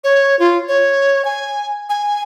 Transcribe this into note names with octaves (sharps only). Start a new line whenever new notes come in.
C#5
F4
C#5
G#5
G#5